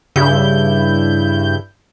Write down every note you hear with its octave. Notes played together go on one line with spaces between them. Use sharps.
G2 C#3 E4 G6